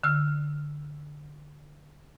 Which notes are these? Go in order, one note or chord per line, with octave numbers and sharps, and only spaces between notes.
D3 E6 F6